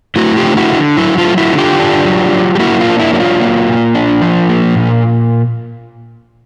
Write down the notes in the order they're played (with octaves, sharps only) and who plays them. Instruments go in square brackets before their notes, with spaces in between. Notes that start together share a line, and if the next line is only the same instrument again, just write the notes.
[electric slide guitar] A3 E4 F#4
F4 G4
D3
E4 F#4
D3
F#3 E4
F4
A3
E4 F#4
D3
F4 G4
D4
F#3
F#3
G4
A#3 E4 F#4
F4
D4
E4
F#3 E4
F4
A#3
A#2
D4
F3
A#3
A#2